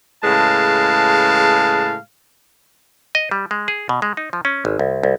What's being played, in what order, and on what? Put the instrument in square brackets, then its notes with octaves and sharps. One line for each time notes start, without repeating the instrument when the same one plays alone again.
[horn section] A2 C#3 G#3 B4 F5 A5
[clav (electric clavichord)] D#5
G3
G#3
G#4
B2
G#3
D#4
F3
C#4
G#1
C2
C2